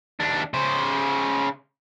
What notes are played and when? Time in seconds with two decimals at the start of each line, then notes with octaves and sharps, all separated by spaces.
0.20 D#2 D4
0.54 C#3 C5